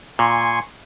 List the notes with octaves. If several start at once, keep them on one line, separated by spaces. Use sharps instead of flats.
A#2 G#5 C6 C#6